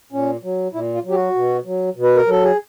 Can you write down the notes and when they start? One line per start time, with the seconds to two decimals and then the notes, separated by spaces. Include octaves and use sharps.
0.12 A#2 C#4
0.43 F#3
0.74 A#2 E4
0.94 F4
1.04 F#3
1.10 G4
1.14 F#4
1.35 B2
1.65 F#3
1.96 B2
2.03 B4
2.16 A#4
2.27 F#3 A4
2.44 G#4